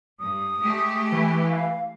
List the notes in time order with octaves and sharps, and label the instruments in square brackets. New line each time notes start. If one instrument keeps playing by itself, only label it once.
[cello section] G2 [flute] D#6
[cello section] G#3 A3 G4
[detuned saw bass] E3
[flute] F5